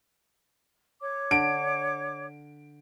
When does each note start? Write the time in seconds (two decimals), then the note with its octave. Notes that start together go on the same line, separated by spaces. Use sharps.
1.01 C#5 D6
1.31 D3 D7